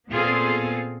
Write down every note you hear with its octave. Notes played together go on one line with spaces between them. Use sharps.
A#2 B3 C4 F4 G#4 A4